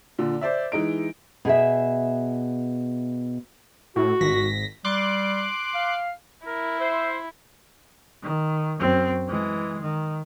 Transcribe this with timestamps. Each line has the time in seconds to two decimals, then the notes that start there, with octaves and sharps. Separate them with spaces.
0.19 A#2 D3
0.41 C5 D5 E5
0.72 E3 G#3 D#4 D7
1.45 B2 G#4 A#4 E5
3.96 A2 F#4
4.21 G#1 A#6 B6
4.85 G3 C6 D6 F#6
5.74 F5
6.47 E4 A#4
6.80 C5 E5
8.22 D#3
8.79 F#2 C4
9.28 E3 G#3
9.81 D#3